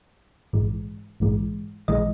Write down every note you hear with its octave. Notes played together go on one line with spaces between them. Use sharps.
A#1 G#2 E3 G#3
A#1 G#2 E3 G#3
A#1 E3 G#3 D#5